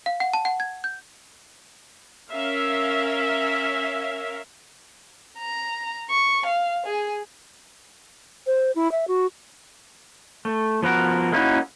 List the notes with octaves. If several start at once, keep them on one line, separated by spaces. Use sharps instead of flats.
F5
F#5
A5
F#5
G#6
G6
C#4 A#4 E5 F5
A#5
C#6
F5
G#4
C5
E4
E5
F#4
A3
F3 B3 F#4 A#4
G#3 A#3 C#4 D#4 E4 F#4